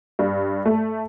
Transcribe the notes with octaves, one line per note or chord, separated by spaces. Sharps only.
G2
A3